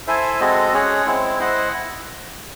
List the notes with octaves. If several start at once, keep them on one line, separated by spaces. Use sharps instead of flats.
E4 A4 C5 E5 G#5
G#3 C4 F#4 A4 D#5
G#3 C#4 G#4 C#5 F#5
G#3 C4 E4
E4 C5 D#5 F#5